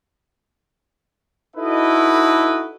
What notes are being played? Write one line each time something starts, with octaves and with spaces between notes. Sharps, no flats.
D#4 E4 F#4 A4 B4 D#5